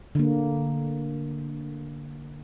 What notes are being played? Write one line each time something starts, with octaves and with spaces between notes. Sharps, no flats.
D3 A#3